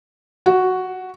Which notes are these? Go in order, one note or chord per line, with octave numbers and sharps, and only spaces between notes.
F#4